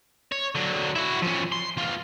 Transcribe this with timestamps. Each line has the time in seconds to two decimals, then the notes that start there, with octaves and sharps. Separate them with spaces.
0.32 C#5
0.55 D3 F#3
0.96 E4 F#4
1.22 F3 C#4
1.52 C6
1.77 E2 F4